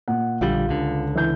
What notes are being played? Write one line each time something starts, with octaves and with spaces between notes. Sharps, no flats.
A#2 F#5
A#1 D3 G3 F4
C#2 D3
E3 G6